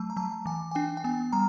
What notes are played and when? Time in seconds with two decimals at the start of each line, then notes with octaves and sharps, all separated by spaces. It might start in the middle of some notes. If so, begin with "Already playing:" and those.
Already playing: F#3 A3 A5
0.10 A#5
0.17 F#3 A5
0.46 E3 G#5
0.71 G#5
0.75 D4 G5
0.97 G5
1.04 B3 G#5
1.32 G3 A#5